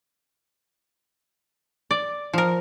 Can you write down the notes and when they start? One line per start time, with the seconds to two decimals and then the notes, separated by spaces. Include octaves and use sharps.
1.91 D5
2.33 F3 A#4